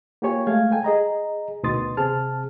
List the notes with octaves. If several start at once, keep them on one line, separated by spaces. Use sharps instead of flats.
A#3 F4 G4 C#5 G#5
G#3 A3 F5 G#6
A4 G5 G#5
G#4 D#5 A#5
D2 B2 D#3 C6 D#6 A6
C3 C4 G#4 A5 F6